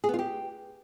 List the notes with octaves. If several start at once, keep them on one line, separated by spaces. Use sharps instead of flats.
G#4
B3
F4
G4